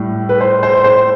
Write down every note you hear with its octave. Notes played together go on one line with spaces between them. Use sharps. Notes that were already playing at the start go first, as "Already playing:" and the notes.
Already playing: A2 G3
B4
C5
C5
C5